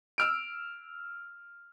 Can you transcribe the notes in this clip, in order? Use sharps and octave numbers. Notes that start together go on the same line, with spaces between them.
E6 F6 D7